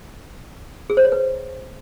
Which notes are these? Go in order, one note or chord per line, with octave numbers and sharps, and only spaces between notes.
G#4
C5
C#5
B4